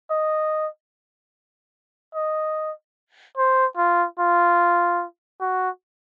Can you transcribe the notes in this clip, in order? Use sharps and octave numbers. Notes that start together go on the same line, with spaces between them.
D#5
D#5
C5
F4
F4
F#4